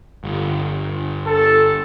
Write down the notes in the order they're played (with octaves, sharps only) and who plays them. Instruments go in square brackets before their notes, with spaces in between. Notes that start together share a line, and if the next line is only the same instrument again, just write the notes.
[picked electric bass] G1
[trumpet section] A4 A5